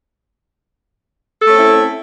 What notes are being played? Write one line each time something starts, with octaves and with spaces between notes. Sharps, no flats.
A3 C4 C#4 E4 A4